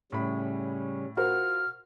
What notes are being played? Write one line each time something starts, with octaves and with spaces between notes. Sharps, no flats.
A2 C#3 G3 C#4 B5
F4 F#4 A#4 C5 F6